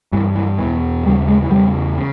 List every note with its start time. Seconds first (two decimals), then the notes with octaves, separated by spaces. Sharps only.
0.12 G2 E3
0.36 E3
0.58 E2 B2 E3
1.05 D#2 C#3 G3
1.28 G#3
1.42 E3
1.50 E2 C#3 G3
1.97 C#3